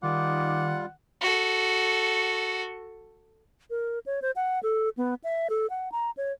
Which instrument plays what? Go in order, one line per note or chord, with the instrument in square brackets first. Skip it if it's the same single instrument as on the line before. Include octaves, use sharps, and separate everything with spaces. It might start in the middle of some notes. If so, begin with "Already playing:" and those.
[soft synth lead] D#3 [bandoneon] G3 F4 [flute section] D#4 D6 [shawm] F#5
[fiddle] F#4 A4
[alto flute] A#4
C#5
C5
F#5
A4
B3
E5
A4
F#5
A#5
C#5